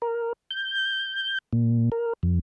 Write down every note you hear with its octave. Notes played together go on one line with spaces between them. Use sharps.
A#4
G6
A#2
A#4
F2